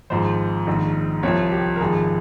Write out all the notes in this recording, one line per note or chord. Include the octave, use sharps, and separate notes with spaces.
G#1 G#2 F3 C5
A#1 G#2 D#3
C2 C3 F3 C#5
G4
A#4
G#1 G#2 F3 G#4